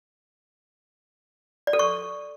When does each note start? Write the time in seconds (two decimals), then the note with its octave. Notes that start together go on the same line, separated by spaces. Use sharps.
1.67 D5
1.73 A4
1.79 C#6